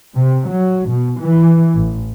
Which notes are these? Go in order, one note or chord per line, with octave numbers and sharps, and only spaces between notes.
C3
F#3
B2
E3
A1